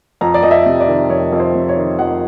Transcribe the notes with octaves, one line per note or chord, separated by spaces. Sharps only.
F2 A#5
D5
F2 D#5
E5
C3
D5
D#3
F2 C#5
F2
C5
C3
C#5
D#3
F2 F#5